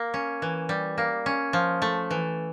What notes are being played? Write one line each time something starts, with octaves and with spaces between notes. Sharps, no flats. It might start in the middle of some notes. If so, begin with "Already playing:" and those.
Already playing: A#3
C#4
E3
G3
A#3
C#4
F3
A3
E3